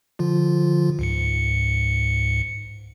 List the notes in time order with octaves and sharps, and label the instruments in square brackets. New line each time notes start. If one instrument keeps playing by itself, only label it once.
[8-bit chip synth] D3 F3 F4
C#2 G#2 C#7